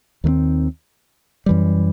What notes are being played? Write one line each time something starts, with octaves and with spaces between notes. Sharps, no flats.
D#2 D#3 A3 C4
F#2 E3 G3